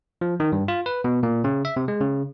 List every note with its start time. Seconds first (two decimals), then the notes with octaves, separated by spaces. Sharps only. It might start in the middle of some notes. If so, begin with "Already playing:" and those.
0.21 F3
0.40 D#3
0.52 G2
0.68 F4
0.86 B4
1.04 B2
1.23 A#2
1.44 C#3
1.65 E5
1.76 C3
1.88 G#3
2.00 C#3